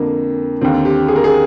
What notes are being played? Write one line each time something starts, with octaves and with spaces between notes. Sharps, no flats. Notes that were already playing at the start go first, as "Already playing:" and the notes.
Already playing: F2 D3 A#3
D#2 D3 C4
G4
G#4
A#4
G#4